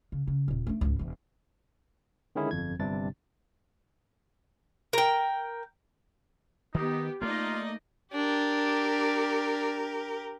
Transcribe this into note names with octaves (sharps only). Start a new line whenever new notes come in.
C#3
C#3
D#1 A#2
A3 D4
C#2 G#2
E1 E3
D3 D#3 G#3 C#4 E4 G#4
G1 F2 G#6
G1 G2 C3 G3 D4 A6
A#4 G5
D#3 B3 D#4 G4
A3 A#3 D#4 F4 D5 D#5
D4 G4 A#4